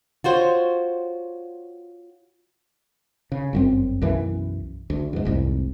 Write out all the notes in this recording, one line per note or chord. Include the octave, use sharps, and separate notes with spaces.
F4 F#4 C5 C#5
C#3
G1 F#2 C4
B1 F#2 E3
D2
E2 G#2
F1 C2 G#2